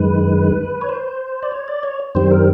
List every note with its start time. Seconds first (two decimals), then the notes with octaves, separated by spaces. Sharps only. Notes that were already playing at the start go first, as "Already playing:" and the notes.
Already playing: F#2 D#3 G#3 B4
0.81 C#5
0.89 C5
1.43 D5
1.52 C#5
1.68 D5
1.83 C#5
2.15 F#2 D#3 G3 C4 C5
2.31 A#4